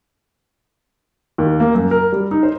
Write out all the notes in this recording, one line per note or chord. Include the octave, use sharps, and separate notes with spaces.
D#2
A#3
F#2
A#4
G3
D#4
C5